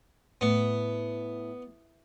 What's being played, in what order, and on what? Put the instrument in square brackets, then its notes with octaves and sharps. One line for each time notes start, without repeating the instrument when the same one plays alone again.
[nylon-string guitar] A2 [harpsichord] B3